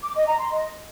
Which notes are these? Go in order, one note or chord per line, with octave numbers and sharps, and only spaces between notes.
D6
D#5
A#5
C6
D#5